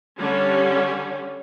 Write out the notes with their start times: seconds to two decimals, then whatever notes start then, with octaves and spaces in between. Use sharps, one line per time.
0.17 D3 G3 C#4